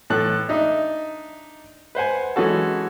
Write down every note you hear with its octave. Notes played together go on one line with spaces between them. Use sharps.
A2 E3 A4 F#6
D4 D#4 D#5 E5
B4 C5 F#5 G#5
E3 G#3 C#4 F#4 A4